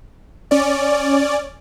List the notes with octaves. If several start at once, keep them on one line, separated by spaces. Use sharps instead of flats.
C#4 D5